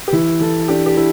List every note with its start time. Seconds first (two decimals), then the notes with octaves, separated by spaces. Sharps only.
0.08 G4
0.13 E3 E4
0.41 E3 A4
0.68 D4 G4
0.86 G4
0.97 E4